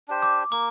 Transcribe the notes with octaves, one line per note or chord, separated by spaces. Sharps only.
D4 G4 C5
D6
A#3 D6